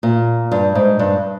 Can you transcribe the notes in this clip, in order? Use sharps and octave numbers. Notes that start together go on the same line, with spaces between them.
A#2
G2
G#2
G2